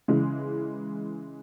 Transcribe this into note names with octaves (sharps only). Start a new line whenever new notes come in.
C#3 E3 G#3